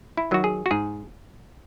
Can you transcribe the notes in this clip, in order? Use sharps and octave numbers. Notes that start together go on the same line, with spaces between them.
E4
D#3 F#3 F#4
G#4
F#4
G#2 G#4